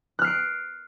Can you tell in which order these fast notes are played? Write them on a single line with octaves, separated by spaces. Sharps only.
F#6 F6 C7 D7